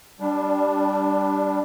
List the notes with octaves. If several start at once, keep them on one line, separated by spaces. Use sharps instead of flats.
G3 D4